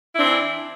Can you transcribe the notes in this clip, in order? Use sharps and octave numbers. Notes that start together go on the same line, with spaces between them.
E3 C4 D4 E4